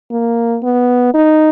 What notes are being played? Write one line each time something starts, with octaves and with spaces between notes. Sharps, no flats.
A#3
B3
D#4